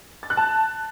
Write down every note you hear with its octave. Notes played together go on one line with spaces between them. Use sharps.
A6
F#6
A5